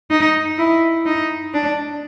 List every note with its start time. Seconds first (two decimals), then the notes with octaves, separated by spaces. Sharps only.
0.11 D#4
0.58 E4
1.06 D#4
1.54 D4